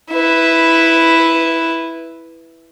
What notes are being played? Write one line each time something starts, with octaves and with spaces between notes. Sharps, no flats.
E4 B4